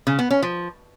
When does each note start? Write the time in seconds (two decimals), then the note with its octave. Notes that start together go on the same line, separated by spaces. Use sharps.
0.07 C#3
0.19 B3
0.31 C#4
0.42 F3